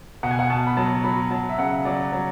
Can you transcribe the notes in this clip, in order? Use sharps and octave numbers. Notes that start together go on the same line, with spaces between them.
B2 F#5
G#5
F#5
B2 A5
B5
F#3 A5
F#3 B5
F#3 A5
E5
C#3 F#5
F#3 D5
F#3